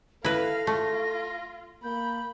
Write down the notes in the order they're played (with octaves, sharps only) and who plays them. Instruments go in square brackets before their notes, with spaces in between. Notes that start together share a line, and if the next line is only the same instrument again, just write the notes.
[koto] E4 B4 [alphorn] A4 [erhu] F5 [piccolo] A#6
[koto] A3 [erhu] F4
[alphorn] A#3 [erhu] B5 [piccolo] G6